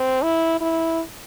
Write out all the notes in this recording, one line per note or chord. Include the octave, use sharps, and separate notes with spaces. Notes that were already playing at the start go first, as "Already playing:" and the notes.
Already playing: C4
E4
E4